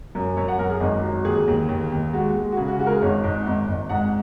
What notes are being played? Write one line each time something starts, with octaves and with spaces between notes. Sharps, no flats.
F#2
F#2 C#5
F#5
F#2 A#4
G#4
G#1 D#5
F#3
D#2 G#4
D#2
D#2
D#2
G#3 F#4
G#3
F#4
C#3 G#4
F#4
G#3 F#4
A#4
G#4
G#1 C#5
G#2
G#1
G#1
G#2 F#5